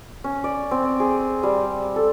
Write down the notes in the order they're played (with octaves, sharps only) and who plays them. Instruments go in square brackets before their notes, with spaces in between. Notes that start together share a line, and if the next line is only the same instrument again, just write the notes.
[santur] C#4
D5
C4
G#4
G3
A4